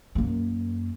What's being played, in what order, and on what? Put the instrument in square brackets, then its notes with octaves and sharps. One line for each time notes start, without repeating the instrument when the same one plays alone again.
[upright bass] F#2 A#3